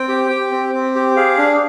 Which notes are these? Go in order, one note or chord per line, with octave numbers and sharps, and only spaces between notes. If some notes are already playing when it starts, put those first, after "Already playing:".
Already playing: C4 G5
G4
G4
C4
C4
G4
G#4 F5
D4